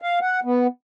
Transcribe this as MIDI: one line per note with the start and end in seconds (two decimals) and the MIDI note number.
0.02 0.19 77
0.21 0.40 78
0.44 0.67 59